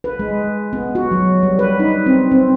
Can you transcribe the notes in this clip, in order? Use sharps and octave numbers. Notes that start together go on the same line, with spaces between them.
B4
G#3
B3
F#4
F#3
G3
B4
D#4
C4
C4